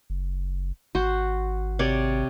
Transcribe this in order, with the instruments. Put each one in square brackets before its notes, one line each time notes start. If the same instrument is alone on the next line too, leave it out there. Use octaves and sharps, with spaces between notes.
[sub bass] F#1
[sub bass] G#1 [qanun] F#4 C5
[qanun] C3 C#5 D5